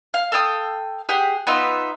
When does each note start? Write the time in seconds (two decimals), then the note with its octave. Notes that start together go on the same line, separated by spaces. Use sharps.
0.14 F5
0.32 A4 F5 G5 D#6
1.09 G4 G#4 F#5
1.47 B3 D#4 F4 E5